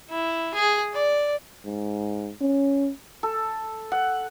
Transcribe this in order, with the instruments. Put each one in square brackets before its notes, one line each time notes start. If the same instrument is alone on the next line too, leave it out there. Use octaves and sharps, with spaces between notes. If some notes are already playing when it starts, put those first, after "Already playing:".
[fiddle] E4
G#4
D5
[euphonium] G#2
C#4
[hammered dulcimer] A4
F#5